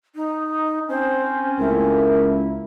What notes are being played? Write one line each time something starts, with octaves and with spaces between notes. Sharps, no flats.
D#4
C4 C#4 C5
C#2 A3 A#3 E4 A#4